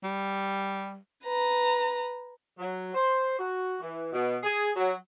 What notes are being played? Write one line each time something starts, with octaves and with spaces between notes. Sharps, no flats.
G3
B4 A#5
F#3
C5
F#4
E3
B2
G#4
F#3